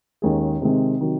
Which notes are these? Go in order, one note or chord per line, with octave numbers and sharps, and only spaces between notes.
D#2 D#3 G#3 C#4 G#4
C3 D#3 G#3 C4
C3 D#3 F#3